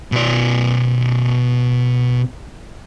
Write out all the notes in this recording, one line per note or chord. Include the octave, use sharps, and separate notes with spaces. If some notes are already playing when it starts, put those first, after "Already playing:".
B2 D5